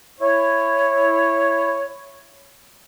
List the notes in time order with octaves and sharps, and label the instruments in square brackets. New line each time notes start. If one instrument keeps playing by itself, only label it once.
[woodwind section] E4 C#5